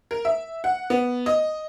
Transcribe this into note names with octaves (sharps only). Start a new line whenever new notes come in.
A#4
E5
F#5
B3
D#5